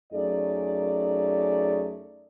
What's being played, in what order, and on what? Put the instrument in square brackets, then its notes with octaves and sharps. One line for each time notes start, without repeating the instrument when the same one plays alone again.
[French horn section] F#2 A3 D#4 G#4 D5